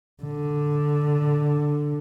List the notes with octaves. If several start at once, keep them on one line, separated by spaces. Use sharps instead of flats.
D3